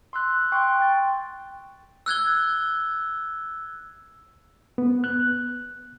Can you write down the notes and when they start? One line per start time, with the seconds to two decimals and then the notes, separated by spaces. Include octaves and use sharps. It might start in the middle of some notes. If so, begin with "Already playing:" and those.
0.13 C6 E6 F#6
0.52 G5 C6 C#6 F#6
0.80 G5 A6
2.06 E6 F#6 G#6 G7
4.78 B3
5.04 F#6